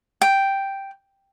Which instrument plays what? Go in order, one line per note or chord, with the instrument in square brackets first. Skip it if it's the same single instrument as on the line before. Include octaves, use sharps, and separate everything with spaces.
[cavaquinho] G5